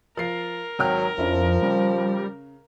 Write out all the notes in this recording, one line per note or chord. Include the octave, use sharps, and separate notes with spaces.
F3 A#4 C7
G#1 F#3 G5 F6
F2 F3 C#4 D4 E4
C#3 G3